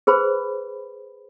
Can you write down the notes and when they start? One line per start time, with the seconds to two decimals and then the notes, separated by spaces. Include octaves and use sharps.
0.07 G#4 B4 C5 B5